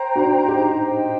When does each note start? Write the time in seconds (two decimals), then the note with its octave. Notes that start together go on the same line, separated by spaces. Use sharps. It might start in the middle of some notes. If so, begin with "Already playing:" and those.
Already playing: C5 G5 A#5
0.16 D4 F#4
0.48 D#4 G4
0.80 C5 D#5 G5